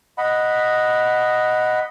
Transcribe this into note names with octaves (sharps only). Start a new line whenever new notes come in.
D#5 F#5 B5